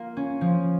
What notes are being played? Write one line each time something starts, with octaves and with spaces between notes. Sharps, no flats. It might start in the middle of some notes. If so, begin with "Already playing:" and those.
Already playing: A#3 F4
C#4
F3